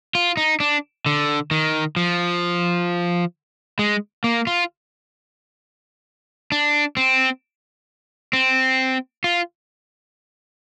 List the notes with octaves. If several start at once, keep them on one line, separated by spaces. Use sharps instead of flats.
F4
D#4
D4
D3
D#3
F3
G#3
A#3
F4
D4
C4
C4
F4